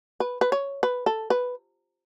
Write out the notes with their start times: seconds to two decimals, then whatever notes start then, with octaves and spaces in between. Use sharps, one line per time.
0.20 B4
0.41 B4
0.52 C#5
0.83 B4
1.06 A4
1.30 B4